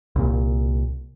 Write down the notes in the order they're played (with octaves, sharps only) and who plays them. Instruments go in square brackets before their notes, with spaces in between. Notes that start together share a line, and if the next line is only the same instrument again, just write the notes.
[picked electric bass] C2 A#2